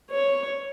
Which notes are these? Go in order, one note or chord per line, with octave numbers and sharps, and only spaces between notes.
C#5